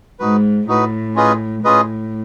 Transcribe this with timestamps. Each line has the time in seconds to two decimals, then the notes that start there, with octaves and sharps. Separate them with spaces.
0.20 G#2 D#4 F#4 B4
0.68 A2 D#4 F#4 B4
1.15 C#4 F4 G#4 B4 D#5
1.64 A2 C#4 F4 G#4 B4 D#5